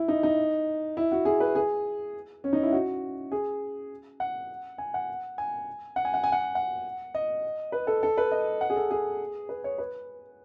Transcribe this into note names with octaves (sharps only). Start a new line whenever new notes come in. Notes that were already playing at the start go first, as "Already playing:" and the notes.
Already playing: E4
D#4
D#4
E4
F#4
G#4
B4
G#4
C#4
D#4
E4
F#4
G#4
F#5
G#5
F#5
G#5
F#5
G#5
F#5
G#5
F#5
F#5
D#5
B4
A4
A4
B4
D#5
F#5
G#4
A4
G#4
B4
C#5
B4